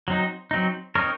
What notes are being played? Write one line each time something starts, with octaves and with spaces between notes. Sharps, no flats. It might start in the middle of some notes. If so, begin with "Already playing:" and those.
F#3 C4 D#4
F#3 C4 D#4
C4 D#4 A#4 C#5